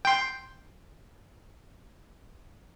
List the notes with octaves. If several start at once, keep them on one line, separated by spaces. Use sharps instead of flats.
G5 C6